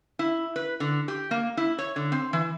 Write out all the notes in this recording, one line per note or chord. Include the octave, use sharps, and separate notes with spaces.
E4
B4
D3
G4
A#3
E4
C#5
D3
C4
E3